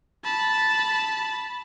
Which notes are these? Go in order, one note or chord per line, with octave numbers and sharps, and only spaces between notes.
A5 B5